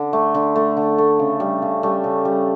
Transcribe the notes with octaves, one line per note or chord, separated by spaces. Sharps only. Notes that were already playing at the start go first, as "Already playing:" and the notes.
Already playing: D3
A3
D3
A3
D3
A3
C#3
G3
C#3
G3 A3
C#3
G3